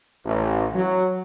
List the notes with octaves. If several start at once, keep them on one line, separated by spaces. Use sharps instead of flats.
A1
F#3